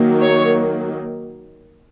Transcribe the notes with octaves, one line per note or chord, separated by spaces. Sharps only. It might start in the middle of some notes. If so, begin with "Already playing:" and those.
Already playing: D#3 F#3 A#3
C#5